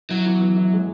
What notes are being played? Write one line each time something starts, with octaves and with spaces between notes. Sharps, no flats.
F#3 E4
E3
E3
E4
G#3